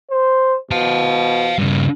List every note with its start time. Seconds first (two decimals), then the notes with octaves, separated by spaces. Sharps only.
0.11 C5
0.71 B2 F5 A5
1.58 G2 C#3